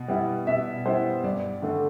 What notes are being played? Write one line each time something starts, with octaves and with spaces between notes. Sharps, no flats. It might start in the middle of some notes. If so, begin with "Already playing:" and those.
Already playing: B2
G3 B3 E4
B2 E5
G3 B3 E4 C5
G2 D5
D3 A3